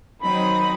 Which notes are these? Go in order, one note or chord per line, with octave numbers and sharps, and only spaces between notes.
D#3 F#3 C4 D#4 B5